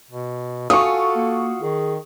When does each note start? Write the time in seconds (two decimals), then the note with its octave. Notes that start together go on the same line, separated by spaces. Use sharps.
0.11 B2
0.70 F4 F#4 A4 G#5 C#6 D#6
1.15 A#3
1.61 D#3 G#4